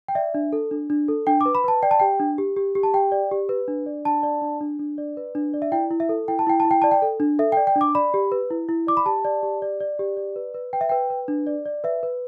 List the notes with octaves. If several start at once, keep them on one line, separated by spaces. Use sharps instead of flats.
G5
D5 E5
D4
A4
D4
D4
A4
D4 G5
D6
B4
B5
B4 A5
D5 G5
A5
G4 G5
D4
G4
G4
G4
A5
G4 G5
D5
G4
B4
D4
D5
D4 A5
D5
D4
D4
D4
D5
B4
D4
D5
E5
E4 G5
E4
E5
A4
E4 G5
A5
E4 G5
E4 A5
G5
D5 A5
G5
A4
D4
A4 E5
G5
D5
G5
D4
D6
D5 B5
G4
B4
E4
E4
D5 D6
B5
G4 A5
D5
G4
D5
D5
G4
D5
B4
B4
B4 G5
E5
B4 G5
B4
D4
D5
D5
B4 E5
B4